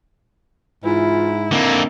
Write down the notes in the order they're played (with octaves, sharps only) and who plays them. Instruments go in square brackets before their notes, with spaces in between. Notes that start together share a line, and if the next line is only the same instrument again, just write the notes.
[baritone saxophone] G#2 [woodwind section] E3 F4 [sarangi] E4
[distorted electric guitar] D3 A#3 [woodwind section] D#3 C4